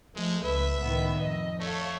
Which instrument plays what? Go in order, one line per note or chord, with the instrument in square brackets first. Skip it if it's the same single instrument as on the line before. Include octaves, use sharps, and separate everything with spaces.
[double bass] F3 A3 [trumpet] G#3
[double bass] C#2 [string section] B4 [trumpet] E5
[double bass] C#2 A2 [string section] D#3 B3
[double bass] F2 [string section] D#5
[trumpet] A3 [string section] A4 C#5 F5